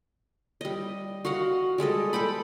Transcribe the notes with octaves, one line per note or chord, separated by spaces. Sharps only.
G3 D#5
F#4 D#5 F5 F#5
G3 G#3 A4 D#5
A4 B4 G5 B5